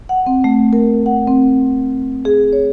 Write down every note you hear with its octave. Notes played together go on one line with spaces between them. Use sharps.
F#5
C4
A3
A#4
F#5
C4
G#4
C#5